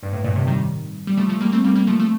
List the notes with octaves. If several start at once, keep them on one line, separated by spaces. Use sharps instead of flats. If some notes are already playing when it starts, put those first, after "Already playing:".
G2
A2
G2 A#2
A2 C3
D#3 G3
G3
F3 A3
F3 A3
G3 A#3
A3 C4
G3 A#3
G3 A#3
F3 A3
F3 A3